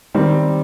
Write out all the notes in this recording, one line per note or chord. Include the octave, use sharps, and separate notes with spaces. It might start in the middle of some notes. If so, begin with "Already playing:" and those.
D#3 G3 C4